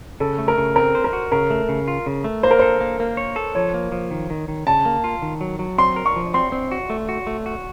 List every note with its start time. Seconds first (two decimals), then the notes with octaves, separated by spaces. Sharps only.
0.20 C#3 A4
0.38 A3
0.48 A#4
0.58 C#3
0.76 C4 A#4
0.95 C5
1.04 A#4
1.13 F#4
1.32 C#3 A#4
1.50 A3
1.69 C#3
1.88 F4
2.06 C#3
2.24 A3
2.43 A#3 C5
2.51 A#4
2.59 A4 C5
2.81 A#3
3.00 A#3
3.17 C#5
3.36 A4
3.55 F3 C#5
3.74 A#3
3.92 F3
4.11 D#3
4.30 D#3
4.48 D#3
4.67 C#3 A5
4.85 A#3
5.04 F4
5.22 D#3
5.41 F#3
5.59 F#3
5.78 C4 C6
5.96 A#4
6.06 C#6
6.16 F3
6.34 C4 C6
6.52 C4
6.72 F#4
6.90 A3
7.09 F#4
7.27 A3
7.46 F#4